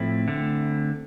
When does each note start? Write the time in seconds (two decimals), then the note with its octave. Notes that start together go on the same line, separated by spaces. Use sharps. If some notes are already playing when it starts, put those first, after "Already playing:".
Already playing: A2 F3 A3 C4 E4
0.28 D3 A3 C4